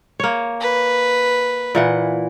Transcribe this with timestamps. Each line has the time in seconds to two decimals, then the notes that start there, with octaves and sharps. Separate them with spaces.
0.20 A#3 C#5
0.61 B4
1.75 A#2 E3 F#5